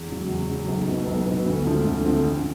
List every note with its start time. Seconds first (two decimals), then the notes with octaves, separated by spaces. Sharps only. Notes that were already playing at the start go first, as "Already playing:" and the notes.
Already playing: E2
0.08 C#3 F#3
0.28 E2
0.48 C#3 F#3
0.68 B1
0.87 B2 F#3 B3
1.06 B1
1.26 B2 F#3 B3
1.46 D2
1.65 D3 F3 A3 C4
1.85 D2
2.04 D3 F3 A3 C4
2.24 A1